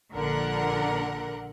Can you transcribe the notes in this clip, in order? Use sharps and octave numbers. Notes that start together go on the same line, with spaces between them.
A#1 D3 A#4 F#5